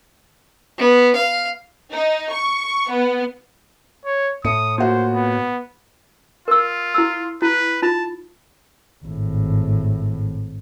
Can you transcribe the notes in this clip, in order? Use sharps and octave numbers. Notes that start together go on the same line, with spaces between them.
B3
F5
D#4
C#6
B3
C#5
A2 D#6 C#7
A#2 F#4 C5
B3
F4 A#4 E6
E4 E6
E4 B4
D#4 F4 A5 B5
G#1 A2